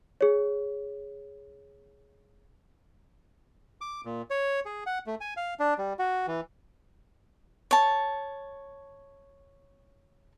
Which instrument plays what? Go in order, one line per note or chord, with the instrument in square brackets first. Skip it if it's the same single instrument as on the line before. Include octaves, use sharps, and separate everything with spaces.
[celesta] G#4 C#5
[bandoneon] D6
A#2
C#5
G#4
F#5
A3
G#5
F5
D4
G3
F#4
E3
[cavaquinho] C#5 A5